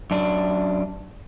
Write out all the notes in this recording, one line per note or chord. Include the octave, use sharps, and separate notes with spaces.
F#2 D4